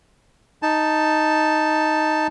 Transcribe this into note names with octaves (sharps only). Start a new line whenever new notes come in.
D#4 A5